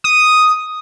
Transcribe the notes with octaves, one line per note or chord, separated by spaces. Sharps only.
D#6